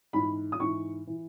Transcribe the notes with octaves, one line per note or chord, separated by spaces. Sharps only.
G#2 E3 B5
D#6
G#2 E3 C#6
E3